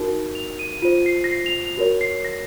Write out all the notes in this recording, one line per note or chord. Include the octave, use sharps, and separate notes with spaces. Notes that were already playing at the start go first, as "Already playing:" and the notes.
Already playing: D#4 F#4 A#4
F7
D#7
F4 C5 D#7
C7
A#6
C7
F7
F7
F#4 A#4 C#5
C7
A#6